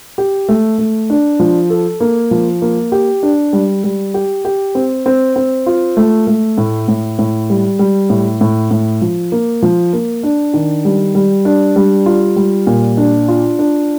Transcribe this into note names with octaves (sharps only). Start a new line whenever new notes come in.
G4
A3
A3
D4
F3
A4
A#3
F3
A#3
G4
D4
G3
G3
G4
G4
C4
C4
C4
F4
A3
A3
A2
A2
A2
G3
G3
A2
A2
A2
F3
A#3
F3
A#3
D4
D#3
G3
G3
D4
G3
F4
G3
A#2
D4
F4
D4